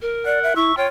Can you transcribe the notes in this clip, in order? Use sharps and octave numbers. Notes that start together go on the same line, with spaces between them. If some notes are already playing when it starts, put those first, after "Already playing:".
A#4
D5 F#5
E5
E4 E5 C#6
F4 C#5 G5